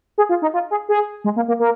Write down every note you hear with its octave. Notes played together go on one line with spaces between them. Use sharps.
G#4
F4
D#4
F4
G#4
G#4
G#3
A#3
A#3
A#3